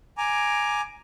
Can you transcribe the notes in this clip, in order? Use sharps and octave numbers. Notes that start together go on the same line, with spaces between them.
G#5 A#5 D6